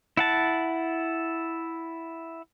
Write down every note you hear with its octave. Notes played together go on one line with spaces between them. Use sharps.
E4 F#5 A5